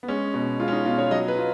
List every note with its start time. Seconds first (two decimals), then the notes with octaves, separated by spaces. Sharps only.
0.03 B3
0.08 G#3 C#4
0.34 B2
0.60 G#3 F4
0.68 C#4
0.72 D#4
0.85 B2 F4
0.98 C#5
1.11 F#3 D#5
1.28 B4
1.38 F4